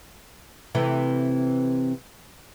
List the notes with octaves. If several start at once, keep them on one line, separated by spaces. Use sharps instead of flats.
C3 E3 A3